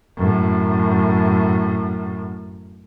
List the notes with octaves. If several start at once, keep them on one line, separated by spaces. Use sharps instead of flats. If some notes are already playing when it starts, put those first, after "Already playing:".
F#2 A2